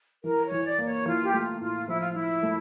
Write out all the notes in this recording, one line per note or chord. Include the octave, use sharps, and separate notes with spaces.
E3 A#4
C#5
E3
D5
A#3
C#5
E3 F4
G4
A3 F4
A2 F4
F3 E4
F4
F3 E4
A3